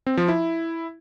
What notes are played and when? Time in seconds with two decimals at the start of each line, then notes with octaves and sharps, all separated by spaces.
0.07 C4
0.17 F3
0.28 E4